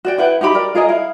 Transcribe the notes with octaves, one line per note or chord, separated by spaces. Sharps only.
F#4 D5 G5
E4 B4 F#5 G5
D#4 F#4 G4 B5
A#4 D5
F4 G#4 A#4 D#5
E4 F5